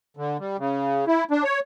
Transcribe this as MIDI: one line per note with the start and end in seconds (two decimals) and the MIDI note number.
0.17 0.37 50
0.40 0.57 55
0.59 1.05 49
1.08 1.24 64
1.31 1.44 62
1.44 1.60 73